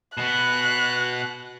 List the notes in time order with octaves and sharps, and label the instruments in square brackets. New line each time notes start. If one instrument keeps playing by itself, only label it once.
[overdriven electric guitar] B2 B3 [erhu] F#6